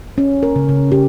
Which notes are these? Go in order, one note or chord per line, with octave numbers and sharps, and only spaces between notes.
C#4
A#4
C#3
C#3
G4